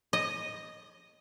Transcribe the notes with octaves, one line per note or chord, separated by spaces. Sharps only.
D#5